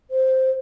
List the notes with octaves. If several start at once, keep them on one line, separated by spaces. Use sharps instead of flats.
C5